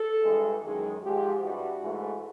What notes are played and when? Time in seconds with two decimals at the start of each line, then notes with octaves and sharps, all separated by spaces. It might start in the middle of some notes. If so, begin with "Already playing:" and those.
Already playing: A4
0.23 G2 E3 G#3
0.62 F#2 D#3 G#3 G#4
1.02 G#2 F3 G#3 G4
1.42 G2 E3 G3 F#4
1.81 G#2 E3 A3